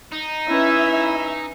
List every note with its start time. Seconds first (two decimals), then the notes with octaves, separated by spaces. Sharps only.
0.12 D#4
0.48 C#4 E4 B4 E5